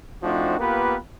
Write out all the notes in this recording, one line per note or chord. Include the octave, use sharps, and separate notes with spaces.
F3 A3 C4 D4 D#4 F#4
A#3 B3 F4 G4 A#4 B4